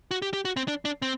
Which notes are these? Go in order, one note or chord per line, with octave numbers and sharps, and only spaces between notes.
F#4
G4
G4
F#4
C4
D4
D4
C4